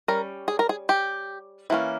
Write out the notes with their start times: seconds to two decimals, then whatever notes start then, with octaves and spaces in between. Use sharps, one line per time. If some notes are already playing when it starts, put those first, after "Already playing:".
0.08 G3 C#4 A#4
0.48 G#4
0.59 A#4
0.69 G#4
0.89 G4
1.70 E3 A#3 C#4